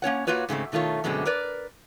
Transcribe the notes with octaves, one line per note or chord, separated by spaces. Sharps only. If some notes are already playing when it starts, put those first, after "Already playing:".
A#3 C#4 C#5 F#5
A#3 F4 F#4 B4 C#5
G#2 C#3 A3 C4
B2 D#3 A3 F4 C#5
F#2 B2 D3 G#3 A3 C4
A#4 B4 D5